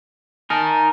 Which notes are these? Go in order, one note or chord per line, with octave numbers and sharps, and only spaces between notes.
D#4 A#4 G#5 A5